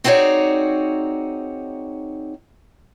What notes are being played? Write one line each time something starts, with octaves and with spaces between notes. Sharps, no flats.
C4 D#4 F#4 G#4 C#5 D5